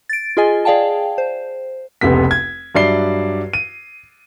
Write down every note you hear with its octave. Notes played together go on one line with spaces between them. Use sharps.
A6 D7
F4 G#4 D#5 G#5
G#4 D5 F5 G5 A5
C5
F1 C#2 C3 B3 B6
G#6
G2 F#3 D5 E5 C7 G7
D#7